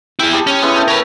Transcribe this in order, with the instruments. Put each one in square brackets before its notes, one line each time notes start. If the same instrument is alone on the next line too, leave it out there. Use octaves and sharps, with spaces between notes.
[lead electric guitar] E4 G#4 [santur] G5
[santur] G3 A5 D#6
[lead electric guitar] C#4
[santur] G#3 B3 E4
A3 G5
[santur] C#4 [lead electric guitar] A#4 B4